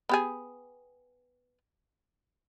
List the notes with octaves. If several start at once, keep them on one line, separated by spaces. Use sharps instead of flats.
B3 G4 G#4